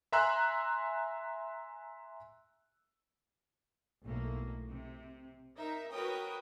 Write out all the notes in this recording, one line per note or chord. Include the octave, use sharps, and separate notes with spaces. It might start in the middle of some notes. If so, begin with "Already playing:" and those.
E5 G#5 A#5 C6 E6 F#6
B1 A2 A#3
C3
D#4 A#4 E5
F#4 A#4 B4 C#5 G5 D#6